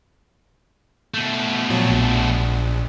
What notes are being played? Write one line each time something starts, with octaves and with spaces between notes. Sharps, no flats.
B2 A3
A#2 F3 F#3
A#1